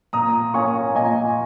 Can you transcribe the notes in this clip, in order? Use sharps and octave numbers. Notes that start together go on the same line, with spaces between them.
A#2 A#5 D#6
A#3 C#4 G#5 C#6
A#2 D#5 G#5